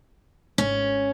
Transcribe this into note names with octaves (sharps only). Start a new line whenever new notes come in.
G#1 C#4